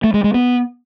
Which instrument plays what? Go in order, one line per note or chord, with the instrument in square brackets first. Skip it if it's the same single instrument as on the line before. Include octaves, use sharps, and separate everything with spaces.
[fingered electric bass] A3
G#3
G#3
B3